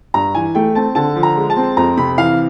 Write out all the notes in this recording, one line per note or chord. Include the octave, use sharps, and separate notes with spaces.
G2 A#5
E3 G#5
A3 G5
C4 A5
D3 A5
F3
A#5
G#3
A5
C4
F2 A#5
C3 B5
E3 F5